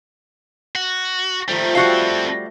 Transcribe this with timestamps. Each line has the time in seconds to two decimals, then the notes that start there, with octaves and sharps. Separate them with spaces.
0.75 F#4
1.48 D#3 F3 G3 A3
1.75 G3 C4 F#4 A4 E5 F5 G5